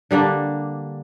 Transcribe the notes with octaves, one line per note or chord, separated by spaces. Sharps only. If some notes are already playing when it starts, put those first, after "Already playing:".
D3 G3 A#3 D4